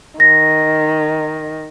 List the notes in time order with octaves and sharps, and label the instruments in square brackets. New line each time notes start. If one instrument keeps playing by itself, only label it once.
[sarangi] D#3 [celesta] A#6